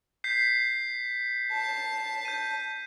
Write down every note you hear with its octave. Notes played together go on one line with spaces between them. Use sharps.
G6 B6 C7
A5
G6 D#7